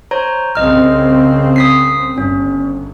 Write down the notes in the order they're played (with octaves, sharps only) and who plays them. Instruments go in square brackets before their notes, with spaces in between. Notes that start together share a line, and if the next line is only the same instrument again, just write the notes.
[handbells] C5 C#5 A#5
[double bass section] C2 C#3 C4 [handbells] D#5 F6
[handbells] D#6 B6 C7
[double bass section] G1 [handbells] C#4